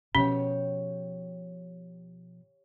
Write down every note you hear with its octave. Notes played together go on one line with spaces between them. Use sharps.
B2 F3 C#4 G4 C#5 G5